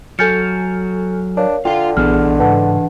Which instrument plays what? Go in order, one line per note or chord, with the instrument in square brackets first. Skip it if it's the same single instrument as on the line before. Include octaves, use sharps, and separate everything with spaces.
[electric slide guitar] F#3 [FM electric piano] A4 G#5 F6 [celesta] G6 A6 C#7
[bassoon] D4 [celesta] A#4 C#5 F5
[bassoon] D3 [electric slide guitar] F4 F5 [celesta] G5
[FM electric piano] A#1 B3 G#4 [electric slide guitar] E3 D4 [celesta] F6
[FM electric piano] G#2 C#3 [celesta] B4 F#5 A5